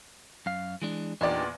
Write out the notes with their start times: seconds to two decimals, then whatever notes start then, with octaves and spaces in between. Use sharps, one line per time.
0.46 F#2 F5
0.82 E3 G#3 D4
1.21 E2 A#2 D4 D#4 G4 D5